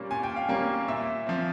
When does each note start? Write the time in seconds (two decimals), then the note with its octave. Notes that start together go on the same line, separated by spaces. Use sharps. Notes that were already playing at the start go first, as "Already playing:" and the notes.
Already playing: A#2 G3 A#3 C#4
0.11 A#2 G#5
0.23 G5
0.36 F5
0.48 G3 A#3 C#4 G5
0.88 A#2 E5
1.27 F3 C4